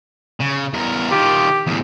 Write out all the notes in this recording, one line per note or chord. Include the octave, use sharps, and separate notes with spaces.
C#3
E2 A#4
D#3 F4 G4
E2 A2